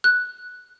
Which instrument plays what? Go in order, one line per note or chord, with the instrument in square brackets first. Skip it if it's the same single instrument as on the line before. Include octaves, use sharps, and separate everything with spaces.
[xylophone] F#6